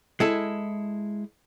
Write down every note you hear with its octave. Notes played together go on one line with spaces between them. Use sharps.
G#3 E4 A4